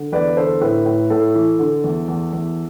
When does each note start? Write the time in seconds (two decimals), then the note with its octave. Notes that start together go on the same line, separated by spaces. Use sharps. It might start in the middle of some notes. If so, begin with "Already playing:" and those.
Already playing: D3
0.12 E2 B4 D5
0.37 D3 A4 C5
0.61 A2 B4
0.86 A2
1.10 A2 A4
1.35 E3
1.59 D3
1.84 E2
2.08 E2
2.33 E2